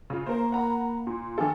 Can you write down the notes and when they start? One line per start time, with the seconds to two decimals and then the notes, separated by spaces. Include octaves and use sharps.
0.10 C#3 F4
0.26 A#3 A#4 C5
0.52 F#5 A#5 B5
1.07 A#2
1.38 D#3 A4 G#5